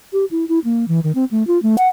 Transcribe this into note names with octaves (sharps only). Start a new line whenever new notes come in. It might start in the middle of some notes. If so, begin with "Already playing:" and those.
G4
E4
E4
A#3
E3
D#3
C4
A3
F4
A3
F#5